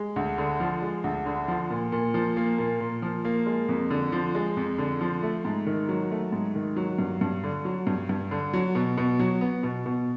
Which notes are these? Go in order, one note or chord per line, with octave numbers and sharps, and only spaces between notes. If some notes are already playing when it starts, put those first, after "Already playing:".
Already playing: G#3
D2
D3
F3
G#3
D2
D3
F3
A#2
A#2
F3
A#3
A#2
A#2
F3
A#3
G#3
F2
D3
F3
G#3
F2
D3
F3
A3
G#2
D#3
F#3
A3
G#2
D#3
F#3
G2
G2
D3
F#3
G2
G2
D3
F#3
B2
B2
F#3
B3
B2
B2